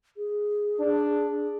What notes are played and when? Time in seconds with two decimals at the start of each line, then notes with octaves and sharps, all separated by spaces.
0.17 G#4
0.80 D4